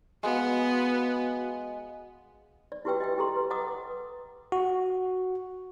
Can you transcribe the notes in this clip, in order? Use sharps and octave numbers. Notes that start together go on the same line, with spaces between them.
G#3 B3 F#4 F5 F#5
D5
E4 F#4 G4 B4 G5 E6
D#5 E5 G5
G4 A4 A#5 C6
B4
D#5 F#5 A#5 D6 D#6
F#4